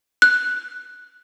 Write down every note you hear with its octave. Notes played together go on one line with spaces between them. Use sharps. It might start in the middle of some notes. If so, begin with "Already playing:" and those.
F#6